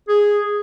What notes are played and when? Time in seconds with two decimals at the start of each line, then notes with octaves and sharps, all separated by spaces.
0.08 G#4